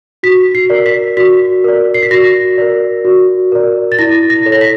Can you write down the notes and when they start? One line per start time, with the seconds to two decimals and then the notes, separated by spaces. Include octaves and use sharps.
0.23 F#4 B6
0.55 C7
0.70 A#4 D5
0.86 B6
1.17 F#4 B6
1.64 A#4 D5
1.94 C7
2.03 B6
2.11 F#4 A#6
2.58 A#4 D5
3.05 F#4
3.52 A#4 D5
3.92 A6
3.99 E4 A#6
4.30 A#6
4.46 A4 C#5
4.52 A#6
4.61 B6